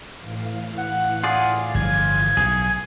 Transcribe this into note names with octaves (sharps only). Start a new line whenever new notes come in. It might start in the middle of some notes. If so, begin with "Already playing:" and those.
A2 E3 F5
F#5
F4 G#4 D5
G1 F3 G#6
B1 B2 G#4